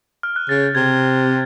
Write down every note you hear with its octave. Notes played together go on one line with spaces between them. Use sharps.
F6
F#6
C#3 A6
G6
C3 G#6